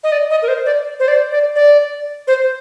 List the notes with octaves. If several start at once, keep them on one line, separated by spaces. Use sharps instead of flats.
D#5
D5
D#5
A#4
C5
D5
C5
D5
D5
D5
C5